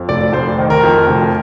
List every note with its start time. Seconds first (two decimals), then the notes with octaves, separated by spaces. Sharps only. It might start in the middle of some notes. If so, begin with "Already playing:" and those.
Already playing: F2
0.09 F1 D5
0.33 F1 C5
0.58 D#3
0.70 A#4
0.83 F2
1.08 F1